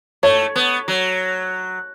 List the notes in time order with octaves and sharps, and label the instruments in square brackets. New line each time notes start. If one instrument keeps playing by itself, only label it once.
[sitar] A3 [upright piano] C#5
[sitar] B3
F#3